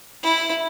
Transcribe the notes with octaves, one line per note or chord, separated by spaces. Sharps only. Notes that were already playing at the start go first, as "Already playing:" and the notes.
E4